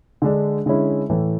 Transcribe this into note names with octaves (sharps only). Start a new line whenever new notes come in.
D3 G#3 D4
D3 G#3 C#4 E4
A2 E3 A3